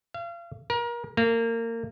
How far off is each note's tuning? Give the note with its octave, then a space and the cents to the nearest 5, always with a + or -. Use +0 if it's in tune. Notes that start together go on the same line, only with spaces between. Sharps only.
F5 -35
A#4 +30
A#3 -25